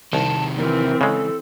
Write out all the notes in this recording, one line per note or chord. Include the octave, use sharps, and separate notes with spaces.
C2 C3 D#3 A5
E3 C4 A#4
C#3 G#3 A4